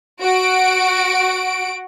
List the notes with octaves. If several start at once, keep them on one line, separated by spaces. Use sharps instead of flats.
F#4 D7